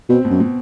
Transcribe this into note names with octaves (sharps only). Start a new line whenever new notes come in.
B2 C4
B2
F#2
B2